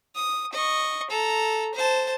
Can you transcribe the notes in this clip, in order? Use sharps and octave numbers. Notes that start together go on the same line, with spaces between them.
D#6
D#5 C#6
A4 A#5
C5 A5